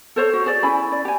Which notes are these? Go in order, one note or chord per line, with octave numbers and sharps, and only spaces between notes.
A4 C5 C#5
F#4
G#4 C5 D5
C#4 E4 G#5 B5
D5
G4 G#5